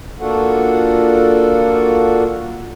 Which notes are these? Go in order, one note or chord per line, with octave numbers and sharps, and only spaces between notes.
A#3 D4 F4 F#4 A4 F#5